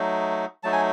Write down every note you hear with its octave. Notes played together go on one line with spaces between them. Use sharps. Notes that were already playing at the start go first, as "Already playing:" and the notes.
Already playing: F#3 A3 D#4
F#3 A3 D#4 A5
G#5